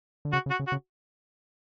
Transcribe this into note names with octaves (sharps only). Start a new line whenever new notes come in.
D3
C#3 F#4
C#3
F#4
C#3
F#4
C#3